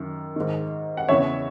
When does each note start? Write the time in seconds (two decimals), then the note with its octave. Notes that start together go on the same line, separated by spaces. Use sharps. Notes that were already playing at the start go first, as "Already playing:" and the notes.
Already playing: F#2 D#3
0.36 G#2 D#3
0.97 F#5
1.09 E2 C#3 E3 C#5 E5